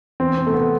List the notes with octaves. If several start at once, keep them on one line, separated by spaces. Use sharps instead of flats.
E2 C4
C4
C3 A3
B3